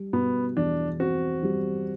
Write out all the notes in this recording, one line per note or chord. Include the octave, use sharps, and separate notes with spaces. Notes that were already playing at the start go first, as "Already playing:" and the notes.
Already playing: G3
B2 B3
E2 D4
C4 F#4
G3